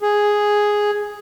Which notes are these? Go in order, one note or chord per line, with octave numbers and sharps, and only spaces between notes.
G#4